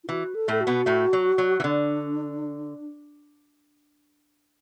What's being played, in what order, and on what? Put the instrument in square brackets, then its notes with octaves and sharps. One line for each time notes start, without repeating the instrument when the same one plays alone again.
[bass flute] E4
[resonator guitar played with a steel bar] E3 [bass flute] F#4
[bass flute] A4
[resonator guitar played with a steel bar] A2 A3 [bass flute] A4
[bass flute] F#4
[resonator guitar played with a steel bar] B2 B3
A2 A3
F#3
F#3
E3
[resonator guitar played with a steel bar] D3 [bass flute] D4